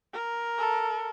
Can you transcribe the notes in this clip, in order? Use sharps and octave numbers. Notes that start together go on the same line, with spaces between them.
A#4
A4